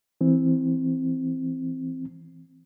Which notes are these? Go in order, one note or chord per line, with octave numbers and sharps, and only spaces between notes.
E3 C4